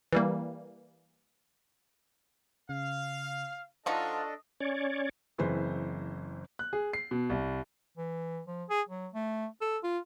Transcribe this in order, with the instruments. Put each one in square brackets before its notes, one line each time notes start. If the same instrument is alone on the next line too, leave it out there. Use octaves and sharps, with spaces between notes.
[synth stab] E3 G3 A#3
[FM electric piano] C#3 [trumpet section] F5
[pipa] F3 D#4 F#4 [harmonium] D4 A4 D#5 [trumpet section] F4 [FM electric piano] D#6
[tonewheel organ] C#4 C#5 D5
[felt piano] F#1 E3 C4 B4 C5
[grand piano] F#6
G#4
C7
B2
C2
[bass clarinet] E3
F3
G#4
F#3
A3
A4
F4